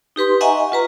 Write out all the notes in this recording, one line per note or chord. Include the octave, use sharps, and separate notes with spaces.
D#4 G4 B4 C6
D#5 E5 F#5 G#5 A#5 C#6
F4 B4 A#5